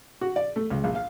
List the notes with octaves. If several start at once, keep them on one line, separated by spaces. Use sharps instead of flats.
F#4
D5
A3
C#2
A#1
F5